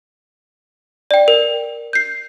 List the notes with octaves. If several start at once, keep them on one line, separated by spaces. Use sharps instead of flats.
D5 G5
A#4
G6 C7